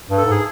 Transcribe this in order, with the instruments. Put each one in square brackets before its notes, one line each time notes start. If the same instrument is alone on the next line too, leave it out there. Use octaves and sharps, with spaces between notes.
[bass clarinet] G2
[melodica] A4
[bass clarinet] G#2
[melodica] G#4